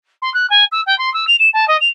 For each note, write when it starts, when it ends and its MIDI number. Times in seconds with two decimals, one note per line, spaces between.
0.22 0.32 84
0.34 0.49 90
0.50 0.65 80
0.72 0.81 88
0.86 0.98 79
0.98 1.12 84
1.14 1.25 88
1.27 1.36 101
1.39 1.49 100
1.53 1.68 81
1.68 1.77 75
1.81 1.88 101